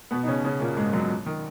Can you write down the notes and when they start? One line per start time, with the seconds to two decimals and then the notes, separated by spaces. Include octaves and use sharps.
0.11 B2 B3
0.23 D#4
0.27 C#3 C#4
0.44 C#3 C#4
0.60 A#2 A#3
0.77 G#2 G#3
0.93 F#2 F#3
1.26 D#3